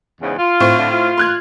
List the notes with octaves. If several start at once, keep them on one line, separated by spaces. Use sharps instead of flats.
E2 G#2 C#3
F4
A2 C4 C#6
D3 F4
F4
C6 F#6 G#6